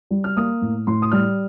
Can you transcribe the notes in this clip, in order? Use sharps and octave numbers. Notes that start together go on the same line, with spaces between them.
G3
F6
A#3 D#6
A2
A2 C6
D#6
G3 F6